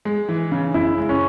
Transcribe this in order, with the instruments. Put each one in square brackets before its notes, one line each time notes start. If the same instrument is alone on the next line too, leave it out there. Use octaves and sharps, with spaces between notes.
[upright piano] G#3
E3
C#3
[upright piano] C#3 [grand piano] E4
[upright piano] G#3
[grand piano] C#4